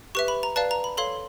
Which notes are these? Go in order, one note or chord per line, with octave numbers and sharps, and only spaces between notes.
G4 B4 E5 C#6
B5
A#5
B4 D5 F5 A5
A#5
B5
A4 C#5 F5 C6